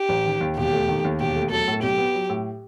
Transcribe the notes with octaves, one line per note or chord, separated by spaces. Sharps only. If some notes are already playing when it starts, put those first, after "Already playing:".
Already playing: G4
A1
D#3
D#2
E1 G4
A3
D#3
D#2
E1 G4
A3
F#3 A4
A2
B1 G4
B3
F#3
A2